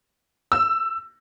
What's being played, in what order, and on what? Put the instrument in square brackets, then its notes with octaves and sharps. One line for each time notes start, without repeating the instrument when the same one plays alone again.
[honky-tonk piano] E6